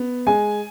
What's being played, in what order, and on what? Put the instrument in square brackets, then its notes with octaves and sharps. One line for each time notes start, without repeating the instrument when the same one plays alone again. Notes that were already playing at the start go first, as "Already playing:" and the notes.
Already playing: [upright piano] B3
G#3 G#5